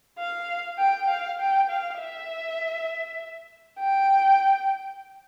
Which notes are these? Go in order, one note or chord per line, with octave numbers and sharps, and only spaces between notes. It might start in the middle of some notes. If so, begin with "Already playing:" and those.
F5
G5
F5
G5
F5
E5
G5